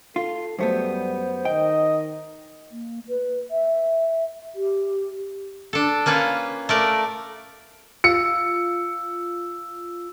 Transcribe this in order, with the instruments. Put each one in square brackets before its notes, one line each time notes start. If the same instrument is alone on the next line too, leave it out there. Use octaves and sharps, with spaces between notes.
[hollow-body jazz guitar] F4 [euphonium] A4
[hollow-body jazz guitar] F#2 A3 B3 [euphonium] G3 [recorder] C5
[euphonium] D#3 [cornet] D#5 [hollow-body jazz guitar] G5
[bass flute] A#3
B4
E5
G4
[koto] D4 A4
A#3 C#4 F4 B4
A3 A#4 D5
[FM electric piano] F4 [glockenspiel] E6 [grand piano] C#7